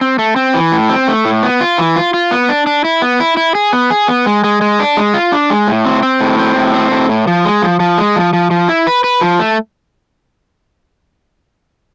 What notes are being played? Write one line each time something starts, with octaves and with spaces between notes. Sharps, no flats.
C4
A3
C4
E3
A2
C4
A3
A2
B3
F4
E3
F4
F4
B3
D4
D4
E4
B3
E4
E4
G#4
B3
G#4
B3
G#3
G#3
G#3
D4
G#3
F4
D4
G#3
A2
C4
C4
A2
C4
A2
C4
A2
A2
F3
G#3
F3
F3
G#3
F3
F3
F3
E4
B4
B4
F3
A3